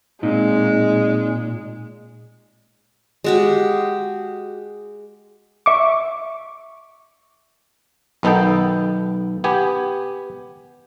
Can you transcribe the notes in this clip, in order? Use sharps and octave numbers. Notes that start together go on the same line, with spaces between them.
A#2 G#3 C4 D#4
G#3 F#4 G4
E5 C#6 D6
B1 D#3 B3 D#4 A4 G5
B3 G4 G#5